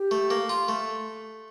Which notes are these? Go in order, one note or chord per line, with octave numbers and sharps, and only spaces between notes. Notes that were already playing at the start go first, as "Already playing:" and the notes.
Already playing: G4
A3
A#3
F4
A3